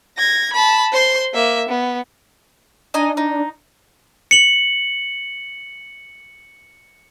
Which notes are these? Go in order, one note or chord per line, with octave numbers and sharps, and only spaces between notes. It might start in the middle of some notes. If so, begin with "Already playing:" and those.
G#6 A#6
A5 B5
C5 C6
A#3 E5
B3
D4 D#4 D#5 G#5
D#4
C#7 F#7